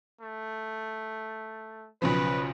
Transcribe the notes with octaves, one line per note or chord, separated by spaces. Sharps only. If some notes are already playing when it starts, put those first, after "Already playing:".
A3
B1 C#3 F3 B4